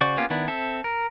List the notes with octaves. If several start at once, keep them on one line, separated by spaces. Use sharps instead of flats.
C#3 F#4 C5 D5 C#6
A#3 B3 C#4 F4 G4
D#3 B3 D4 E4
C4 A4 E5
A#4